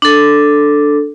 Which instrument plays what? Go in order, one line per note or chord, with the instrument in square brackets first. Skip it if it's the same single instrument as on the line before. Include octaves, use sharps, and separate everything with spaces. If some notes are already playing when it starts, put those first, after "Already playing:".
[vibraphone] D4 A4